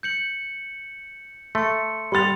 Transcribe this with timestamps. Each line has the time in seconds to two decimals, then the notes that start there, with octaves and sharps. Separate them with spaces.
0.03 G6 C#7 F#7
1.55 A3 C6 C#7
2.12 G3 B5 C6 A6 F7